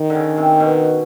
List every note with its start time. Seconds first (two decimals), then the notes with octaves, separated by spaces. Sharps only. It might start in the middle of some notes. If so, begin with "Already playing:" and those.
Already playing: D#3
0.10 D3
0.15 C#3
0.37 C3
0.60 B2